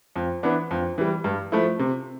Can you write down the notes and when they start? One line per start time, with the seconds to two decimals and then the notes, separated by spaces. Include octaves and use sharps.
0.16 F2
0.43 E3 B3 D4
0.71 F2
0.98 E3 G3
1.24 G2
1.52 F3 A3 E4
1.79 C3